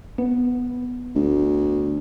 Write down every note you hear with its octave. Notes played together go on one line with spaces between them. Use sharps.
B3
D2